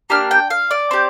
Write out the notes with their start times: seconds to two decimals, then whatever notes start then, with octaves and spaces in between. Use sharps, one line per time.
0.10 A#3 D4 G4 F6
0.31 G5
0.50 F5
0.71 D5
0.91 C4 G4